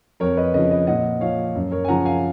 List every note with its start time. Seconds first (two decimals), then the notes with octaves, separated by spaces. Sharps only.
0.20 F2 A#4 C#5
0.37 B4 D#5
0.54 C#3 F3 B4 D#5
0.71 B4 D#5
0.87 A#2 D#5 F#5
1.21 F3 C#5 F5
1.55 F#2
1.71 A#4 C#5
1.84 G#5
1.88 C#3 F3 F#5 A#5
2.05 F5 G#5